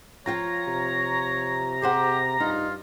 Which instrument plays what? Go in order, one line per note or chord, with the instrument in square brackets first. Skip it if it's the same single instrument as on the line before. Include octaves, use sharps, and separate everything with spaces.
[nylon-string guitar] F3 F4 G5 [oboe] C#5 [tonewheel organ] A#5
[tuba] C3
[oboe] G4 [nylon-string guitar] G#4 C5 F#5
[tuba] G2 [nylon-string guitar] D#4 [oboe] F4